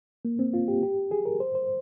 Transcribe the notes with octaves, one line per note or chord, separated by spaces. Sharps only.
A#3
C4
F4
G4
G4
G#4
A#4
C5
C5